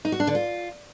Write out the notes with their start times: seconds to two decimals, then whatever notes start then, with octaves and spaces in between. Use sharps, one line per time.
0.05 D#4
0.12 F#4
0.20 D4
0.27 D3
0.35 F4